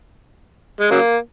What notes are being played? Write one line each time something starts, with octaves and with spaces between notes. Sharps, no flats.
G#3
C#3 F#3 A#3